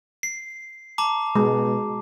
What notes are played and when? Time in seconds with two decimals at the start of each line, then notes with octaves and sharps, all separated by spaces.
0.23 C7
0.98 A5 A#5 D6
1.35 B2 G#3